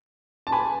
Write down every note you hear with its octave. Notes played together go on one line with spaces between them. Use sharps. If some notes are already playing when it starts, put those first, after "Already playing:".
A5
G#5 B5